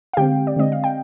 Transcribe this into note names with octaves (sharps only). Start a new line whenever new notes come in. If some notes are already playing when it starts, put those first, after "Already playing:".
F5
D3 G#3 C4 G4 G5
D5
D3 G#3 C4 D#5
F5
G5